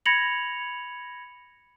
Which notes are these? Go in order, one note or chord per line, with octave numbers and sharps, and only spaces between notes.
B5 G#6 A#6 C#7 F7 F#7